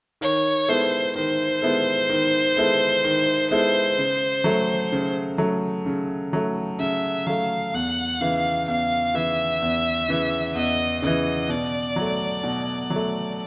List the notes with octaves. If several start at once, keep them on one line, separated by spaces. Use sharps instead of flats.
D#3 C#5
G#3 B3 E4 A4 C5
D#3 C5
G#3 B3 E4 A4
D#3
G#3 B3 E4 A4
D#3
G#3 B3 E4 A4
C#3
F#3 A3
C#3
F#3 A3
C#3
F#3 A3
C#3 E5
F#3 A3 F5
E2 F#5
C#3 E3 F5
E2 F5
C#3 E3 E5
E2
C#3 E3
E2 D#5
C#3 E3 D#5
B2 D5
F#3 A3
B2
F#3
A3